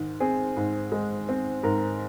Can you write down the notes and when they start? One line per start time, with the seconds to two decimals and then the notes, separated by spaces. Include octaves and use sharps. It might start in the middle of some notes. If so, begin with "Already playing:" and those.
Already playing: G#2 D#3
0.20 C4 G#4
0.57 G#2
0.92 G#3
1.29 C4
1.63 G#2 A#4